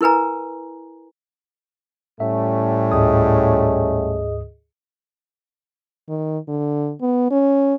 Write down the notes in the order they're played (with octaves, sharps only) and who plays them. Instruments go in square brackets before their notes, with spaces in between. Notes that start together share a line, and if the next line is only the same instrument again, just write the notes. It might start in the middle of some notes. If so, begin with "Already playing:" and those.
[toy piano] E4 A#4 B4 G#5 A#5
[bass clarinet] A2 [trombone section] G3 A3 C#4 [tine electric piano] E5
[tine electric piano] D2 G#2 D#6 [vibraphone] G#4 D#5
[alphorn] D#3
D3
B3
C#4